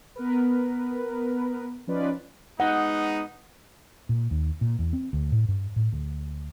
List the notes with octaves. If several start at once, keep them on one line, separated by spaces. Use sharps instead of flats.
B3 A#4 B4
F3 C#4 D#4 F4 B4 D5
G#3 B3 D#4 F#5
A#2
D#2
A#2
E2
C4
D2
A2
G2
A2
D2